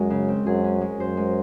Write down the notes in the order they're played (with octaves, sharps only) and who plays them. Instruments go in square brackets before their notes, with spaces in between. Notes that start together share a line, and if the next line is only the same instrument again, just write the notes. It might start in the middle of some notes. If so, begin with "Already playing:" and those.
Already playing: [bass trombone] F#2 [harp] G#3 F#4
[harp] C#3
C4
[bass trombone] F#2 [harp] G#4
[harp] C#4
G#3
[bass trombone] F#2 [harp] C5
[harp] G#3